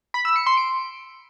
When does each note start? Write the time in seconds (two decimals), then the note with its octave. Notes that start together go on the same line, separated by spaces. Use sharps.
0.14 B5
0.25 E6
0.36 C#7
0.46 C6
0.57 D7